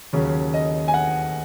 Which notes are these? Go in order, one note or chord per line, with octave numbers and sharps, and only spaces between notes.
D#2 C#3 F#3 C#4
D#5
G#5
F#5